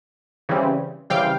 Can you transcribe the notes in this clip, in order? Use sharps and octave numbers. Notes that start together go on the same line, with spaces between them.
C#3 E3 G3 C4
C#3 E3 G3 C4 F5 G5